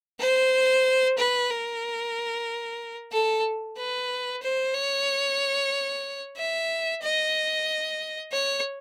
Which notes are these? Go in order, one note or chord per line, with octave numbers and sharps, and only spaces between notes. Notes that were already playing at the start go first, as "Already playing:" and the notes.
C5
B4
A#4
A4
B4
C5
C#5
E5
D#5
C#5